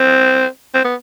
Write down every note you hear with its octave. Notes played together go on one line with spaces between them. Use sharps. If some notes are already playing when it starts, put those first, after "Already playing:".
Already playing: C4
C4
B3